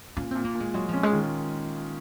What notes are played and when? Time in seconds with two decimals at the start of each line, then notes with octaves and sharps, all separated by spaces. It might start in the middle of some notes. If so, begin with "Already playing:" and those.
0.17 A#2 C#4
0.31 A#2 C4
0.44 A#3
0.55 A#2
0.60 G#3
0.74 F#3 G#3
0.89 F3 C#4
1.03 G#3
1.12 D#3